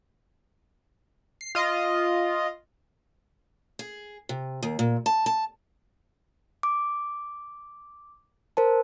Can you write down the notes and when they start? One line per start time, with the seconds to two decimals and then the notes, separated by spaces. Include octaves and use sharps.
1.41 C7
1.55 F4 D#5
3.79 G#4
4.29 C3
4.63 D#2
4.79 A#2
5.06 A5
5.26 A5
6.63 D6
8.57 A#4 C5 A5